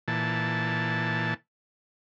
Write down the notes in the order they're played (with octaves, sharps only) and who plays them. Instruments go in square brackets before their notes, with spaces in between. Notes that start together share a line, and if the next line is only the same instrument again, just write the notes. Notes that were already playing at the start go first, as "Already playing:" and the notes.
[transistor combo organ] A#2 E3 A5